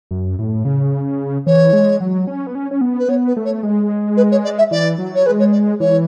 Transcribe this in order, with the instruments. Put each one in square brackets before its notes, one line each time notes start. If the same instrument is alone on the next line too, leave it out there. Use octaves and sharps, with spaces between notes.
[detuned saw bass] F#2
A2
C#3
[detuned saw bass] E3 [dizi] C#5
[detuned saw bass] G#3
F#3
C#4
B3
C#4
C#4
B3
[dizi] B4
[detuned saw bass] B3 [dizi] C#5
[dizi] B4
[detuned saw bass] A3
[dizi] C#5
[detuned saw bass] G#3
[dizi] B4
C#5
D5
E5
[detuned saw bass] E3 [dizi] D5
[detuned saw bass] F#3
[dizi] C#5
[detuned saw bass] G#3 [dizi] B4
[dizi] C#5
D5
[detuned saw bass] E3 [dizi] C#5